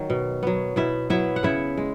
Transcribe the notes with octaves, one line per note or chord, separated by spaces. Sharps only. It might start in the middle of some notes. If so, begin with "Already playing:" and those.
Already playing: D#3 F#3
B2
F#3 B3
B2 E4 E5
F#3 B3 E4 E5
F#5
C#3 E4 E5
G#3